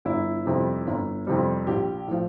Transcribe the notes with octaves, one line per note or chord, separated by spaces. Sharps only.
G1 E4
F2 C3 G3
G1
F2 C3 G3
A#1 G4
A2 F3